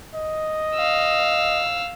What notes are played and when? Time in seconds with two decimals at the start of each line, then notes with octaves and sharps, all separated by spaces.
0.15 D#5
0.75 F5 E6